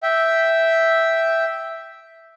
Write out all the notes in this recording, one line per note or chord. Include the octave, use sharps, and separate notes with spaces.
E5 G5